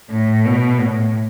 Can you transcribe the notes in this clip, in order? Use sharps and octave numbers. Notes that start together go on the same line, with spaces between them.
A2
B2
A2